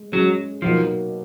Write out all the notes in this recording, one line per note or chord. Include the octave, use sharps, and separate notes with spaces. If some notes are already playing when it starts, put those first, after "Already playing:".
Already playing: G#3
F#3 G#3 C#4 G#4
B2 F3 F#3 A#3 D#4